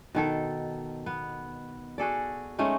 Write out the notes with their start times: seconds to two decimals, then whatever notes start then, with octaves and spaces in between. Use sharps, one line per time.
0.15 B2 D#3 A4
1.06 B3
1.98 F#4 G#4 A4 D5
2.59 G#3 A3 C#4 D#4